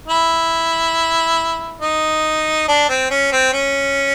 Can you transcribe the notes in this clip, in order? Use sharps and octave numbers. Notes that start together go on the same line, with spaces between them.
E4
D#4
D4
C4
C#4
C4
C#4